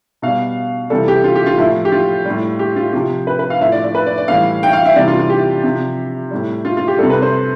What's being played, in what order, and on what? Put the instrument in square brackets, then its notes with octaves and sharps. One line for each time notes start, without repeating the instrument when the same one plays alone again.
[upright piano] B2 G3 F5
C3 E3 G3 A4
G4
F4
G4
F4
A2 F3 E4
G4
F4
G3
A2
G4
F4
C3 F3 G4
B4
B4
F5
A2 F3 E5
D5
D5
B4
D5
D5
A2 E3 G3 F5
G5
F5
E5
C3 E3 G3 D5
F4
F4
G4
C3 F3
A2 G3
F4
F4
G4
C3 G3 A4
B4
C5